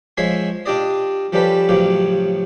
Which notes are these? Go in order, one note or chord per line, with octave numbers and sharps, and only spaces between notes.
F3 G#3 C#5 E5 G#5 C6
D4 F4 G4 D5 D#5
F3 G3 C#4 G4 A4 B4
A1 C#3 F3 F#3 G4